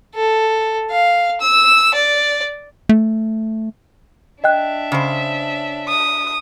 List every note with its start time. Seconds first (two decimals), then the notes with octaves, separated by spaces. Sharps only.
0.15 A4
0.91 F5
1.41 E6
1.94 D5
2.89 A3
4.44 D4 D#5 E5 G5 F#6
4.92 C#3 C5
5.88 D#6